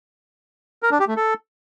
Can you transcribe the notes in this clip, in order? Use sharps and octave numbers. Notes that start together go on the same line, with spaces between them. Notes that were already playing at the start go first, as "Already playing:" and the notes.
A#4
D4
G4
A3
A4